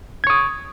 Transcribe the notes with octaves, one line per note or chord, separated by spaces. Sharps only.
C#6 D#6 G#6